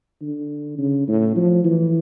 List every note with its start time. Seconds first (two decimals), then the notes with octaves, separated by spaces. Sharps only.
0.22 D3
0.79 C#3
1.08 A2
1.36 F3
1.64 E3